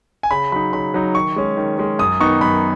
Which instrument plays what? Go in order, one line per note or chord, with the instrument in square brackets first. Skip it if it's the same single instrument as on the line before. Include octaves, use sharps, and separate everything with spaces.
[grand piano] G#5
C#3 B5
F#3 D#4 B5
C#3 B5
F#3 D#4
D#3 C#6
G#3 C#4
D#3
G#3 C#4
F#2 D#6
D#3 B3 D#4 C#6
F#2 B5